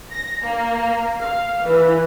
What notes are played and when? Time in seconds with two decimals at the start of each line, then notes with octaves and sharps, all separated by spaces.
0.12 A#6
0.46 A#3
1.22 F5
1.67 E3